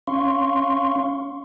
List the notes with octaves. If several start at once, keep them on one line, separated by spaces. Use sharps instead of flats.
C#4 F5 C6 C#6